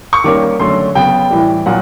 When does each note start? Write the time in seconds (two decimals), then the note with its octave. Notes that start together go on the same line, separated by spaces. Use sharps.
0.13 C#6
0.24 D#3 G3 A#3 C#4 D6
0.60 D3 F#3 A3 C#4 C6
0.95 C#3 F#3 B3 G5
1.30 A2 E3 G3
1.66 A#2 F#3 F#5